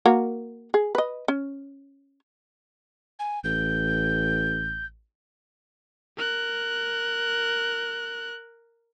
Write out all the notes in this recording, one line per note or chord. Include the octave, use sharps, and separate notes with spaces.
A#3 F#4 A#4
G#4
B4 D#5
C#4
G#5
A1 G6
A#4 F#6